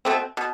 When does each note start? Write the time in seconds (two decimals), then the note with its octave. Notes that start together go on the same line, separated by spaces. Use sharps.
0.05 B2 A3 C4
0.37 B2